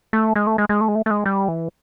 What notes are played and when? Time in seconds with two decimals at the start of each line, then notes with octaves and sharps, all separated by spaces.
0.13 A3
0.36 G#3
0.47 A3
0.58 G#3
0.69 G#3
0.81 A3
0.88 G#3
0.95 A3
1.06 A3
1.11 G#3
1.26 G3
1.48 E3